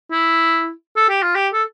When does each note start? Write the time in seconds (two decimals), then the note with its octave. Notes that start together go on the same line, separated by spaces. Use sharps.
0.11 E4
0.96 A4
1.09 G4
1.22 F4
1.35 G4
1.53 A4